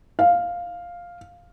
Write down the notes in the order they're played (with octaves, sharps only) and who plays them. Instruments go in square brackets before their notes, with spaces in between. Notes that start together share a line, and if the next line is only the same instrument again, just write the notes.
[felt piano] F5